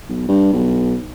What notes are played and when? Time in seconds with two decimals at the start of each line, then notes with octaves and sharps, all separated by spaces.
0.09 B1
0.28 G2
0.53 B1